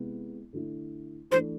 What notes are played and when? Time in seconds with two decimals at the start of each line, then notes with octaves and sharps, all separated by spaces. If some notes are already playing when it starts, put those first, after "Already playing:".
Already playing: C3 G#3 B3 E4
0.53 D3 A3 E4
1.31 E3 A3 D4 C5